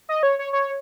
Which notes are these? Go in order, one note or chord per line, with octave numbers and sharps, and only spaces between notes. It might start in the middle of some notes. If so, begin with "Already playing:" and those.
D#5
C#5
C#5
C#5